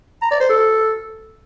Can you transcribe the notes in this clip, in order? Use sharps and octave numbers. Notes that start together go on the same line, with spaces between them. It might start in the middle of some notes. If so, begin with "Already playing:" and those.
A#5
D5
C5
A4